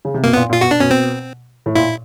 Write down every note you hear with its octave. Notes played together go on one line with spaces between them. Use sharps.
C#3
C3
B2 A#3
A#2 B3
A#2
F4
B2 F#4
D4
B2 C#4
C4
A2
A#2 E4